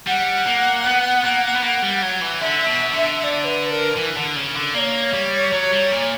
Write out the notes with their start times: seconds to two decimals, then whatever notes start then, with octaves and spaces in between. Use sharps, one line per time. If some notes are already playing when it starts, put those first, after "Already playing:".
0.07 G3 F#5
0.46 A#3
0.85 B3
1.25 A#3
1.55 B3
1.64 A#3
1.83 G3
2.02 F#3
2.21 E3
2.41 D3 E5
2.67 B2
2.93 D3
3.19 E5
3.24 D5
3.45 B4
3.71 A#4
3.97 E3
4.17 D3
4.36 C#3
4.55 D3
4.74 A#3 D5
4.79 C#5
5.13 G3
5.53 F#3
5.72 G3
5.92 A#2